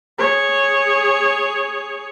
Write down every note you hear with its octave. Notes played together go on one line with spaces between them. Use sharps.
G#4 C#5